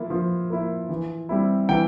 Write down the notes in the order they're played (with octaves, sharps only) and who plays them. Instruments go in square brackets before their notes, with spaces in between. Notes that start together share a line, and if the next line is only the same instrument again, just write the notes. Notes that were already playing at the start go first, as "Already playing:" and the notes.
Already playing: [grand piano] F3 A#3 E4
F3
A#3 E4
E3
G3 C4 E4
E3 G5